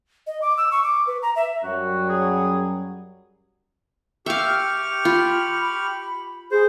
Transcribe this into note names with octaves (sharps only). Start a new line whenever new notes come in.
D#5
D6
E6
C#6
D6
B4
A#5
E5
F#2 F#3 G3 F#4
G#4
G4 E5 F5 C#6 F6
F4 B5
G#4 C5